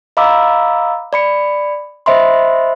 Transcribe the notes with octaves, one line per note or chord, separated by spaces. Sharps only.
D#5 F5 A#5 B5 D6 E6
D5 B5 C#7
C5 D#5 E5 B5 C6